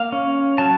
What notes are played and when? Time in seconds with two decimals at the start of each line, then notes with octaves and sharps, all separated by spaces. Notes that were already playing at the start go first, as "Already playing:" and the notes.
Already playing: A#3 F5
0.12 C#4
0.58 F#3 A5